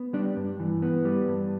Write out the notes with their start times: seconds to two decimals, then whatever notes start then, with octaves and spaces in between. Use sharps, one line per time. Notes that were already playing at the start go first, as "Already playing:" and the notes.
Already playing: B3
0.13 G3 D4
0.37 G2
0.60 E3
0.82 B3
1.05 G3
1.28 G2